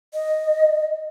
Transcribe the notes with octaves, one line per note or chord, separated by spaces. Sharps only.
D#5